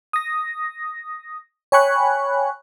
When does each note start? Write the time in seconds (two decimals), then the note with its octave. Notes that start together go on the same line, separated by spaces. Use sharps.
0.13 D#6 A#6
1.72 C#5 G5 G#5 B5 C#6 F#6